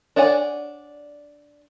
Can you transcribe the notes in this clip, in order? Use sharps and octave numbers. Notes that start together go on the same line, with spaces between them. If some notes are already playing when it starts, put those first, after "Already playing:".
D4 C#5 D5 F#5 G#5